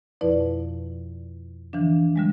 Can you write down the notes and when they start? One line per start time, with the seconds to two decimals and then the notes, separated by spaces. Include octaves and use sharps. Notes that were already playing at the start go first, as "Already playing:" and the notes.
0.21 F2 B2 F3 E4 B4 D5
1.73 D3 E3 F3 D4
2.16 D3 G3 G#3